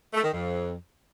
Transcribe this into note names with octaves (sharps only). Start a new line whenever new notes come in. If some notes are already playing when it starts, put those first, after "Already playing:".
A3
D#3
F2